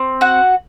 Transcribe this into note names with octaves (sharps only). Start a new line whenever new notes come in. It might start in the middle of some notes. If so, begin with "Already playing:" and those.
Already playing: C4
F#4 F#5